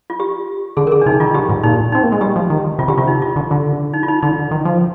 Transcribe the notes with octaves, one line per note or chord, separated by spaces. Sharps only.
F4
G4
D3 G#4
A#4
G#4
D4
C3 D#4
D#3 F4
D3 G4
G#2
A#2 D#4
C4 D#4
A#3
G#3
G3 G4
F3
D#3
C3 F4
D3 G4
C3 F4
D#4
F4
D3
D3
D#4
F4
D#4
D3 D#4
D#3
F3